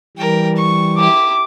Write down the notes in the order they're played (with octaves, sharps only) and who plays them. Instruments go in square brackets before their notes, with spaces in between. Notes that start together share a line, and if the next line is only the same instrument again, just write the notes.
[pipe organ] E3 G3 [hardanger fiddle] A#4 G5
[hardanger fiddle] C#6
[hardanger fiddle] E4 G4 [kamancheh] D6